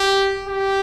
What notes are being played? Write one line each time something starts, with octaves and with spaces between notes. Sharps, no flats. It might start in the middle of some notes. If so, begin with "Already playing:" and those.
Already playing: G4
G4